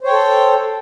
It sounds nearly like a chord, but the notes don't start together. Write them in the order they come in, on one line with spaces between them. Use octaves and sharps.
C5 C#5 G5 A4